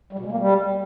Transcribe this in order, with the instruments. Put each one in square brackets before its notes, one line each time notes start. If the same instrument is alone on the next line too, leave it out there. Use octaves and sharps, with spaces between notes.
[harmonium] G3
B2
G#3
A#3
G3